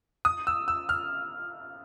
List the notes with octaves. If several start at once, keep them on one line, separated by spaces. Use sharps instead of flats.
D#6
E6
E6
F6